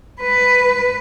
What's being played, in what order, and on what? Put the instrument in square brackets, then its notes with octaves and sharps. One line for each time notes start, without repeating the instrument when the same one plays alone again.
[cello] B4